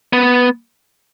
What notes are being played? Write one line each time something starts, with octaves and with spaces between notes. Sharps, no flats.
B3